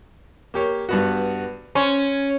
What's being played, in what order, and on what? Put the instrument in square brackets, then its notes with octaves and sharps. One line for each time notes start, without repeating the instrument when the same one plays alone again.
[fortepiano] A#3 G4 C#5
G2 B3 F#4
[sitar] C#4 [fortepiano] C5